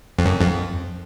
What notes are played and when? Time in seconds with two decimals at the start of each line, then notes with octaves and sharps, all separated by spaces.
0.19 F2
0.25 F#2
0.41 F2